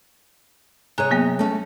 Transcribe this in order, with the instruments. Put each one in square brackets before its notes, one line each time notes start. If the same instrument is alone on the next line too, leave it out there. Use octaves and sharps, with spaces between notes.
[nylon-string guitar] C3 G#4 C#5 [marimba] G#5 A#5 F#6
[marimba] F#3 A#3 B3
[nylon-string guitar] A3 C#4